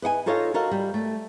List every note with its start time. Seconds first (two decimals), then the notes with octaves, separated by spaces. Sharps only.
0.02 B4 D#5 F#5 G#5
0.26 D#4 F4 A4 C#5 D#5 F5
0.54 F#4 A4 A#4 D#5 F5
0.71 G3
0.94 A3